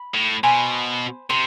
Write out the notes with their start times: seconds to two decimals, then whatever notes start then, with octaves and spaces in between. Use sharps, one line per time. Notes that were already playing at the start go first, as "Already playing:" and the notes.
Already playing: B5
0.14 A2
0.43 B2 C5 G#5 B5
1.29 C3 C5